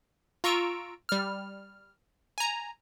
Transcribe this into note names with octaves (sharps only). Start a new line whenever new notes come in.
F4 A#5 C#6 E6 D7
G3 F6
G#5 A#5